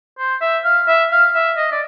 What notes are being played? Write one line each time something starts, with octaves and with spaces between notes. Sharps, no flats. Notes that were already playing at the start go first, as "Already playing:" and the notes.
C5
E5
F5
E5
F5
E5
D#5
D5